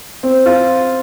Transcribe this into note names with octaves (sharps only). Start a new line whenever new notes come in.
C4
F4